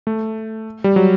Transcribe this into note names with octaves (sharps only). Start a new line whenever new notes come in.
A3
G3
F#3